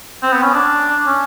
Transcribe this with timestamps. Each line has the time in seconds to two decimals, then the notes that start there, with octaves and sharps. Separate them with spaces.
0.23 C4
0.33 B3
0.43 C#4
0.54 D4
1.07 C#4